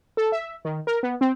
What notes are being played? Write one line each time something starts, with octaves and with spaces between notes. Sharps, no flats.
A4
E5
D#3
A#4
B3
C4